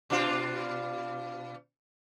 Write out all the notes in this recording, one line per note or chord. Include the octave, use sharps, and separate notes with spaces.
B2 D4 F4